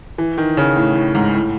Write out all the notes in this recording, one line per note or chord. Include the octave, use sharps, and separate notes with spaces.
E3
D#3
C#3
A2
A2
G#2
A2